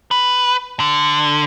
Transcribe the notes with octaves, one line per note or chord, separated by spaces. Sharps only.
B4
D3